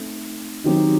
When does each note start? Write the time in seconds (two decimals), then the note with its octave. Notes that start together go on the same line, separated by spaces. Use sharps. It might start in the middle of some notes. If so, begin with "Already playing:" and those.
Already playing: A3 C4 D#4 A4
0.64 D#3 F#3 C4 D#4 G4